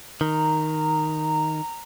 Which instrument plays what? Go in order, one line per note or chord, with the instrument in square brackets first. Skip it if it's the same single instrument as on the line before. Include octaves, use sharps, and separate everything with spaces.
[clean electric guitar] D#3 [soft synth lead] A#5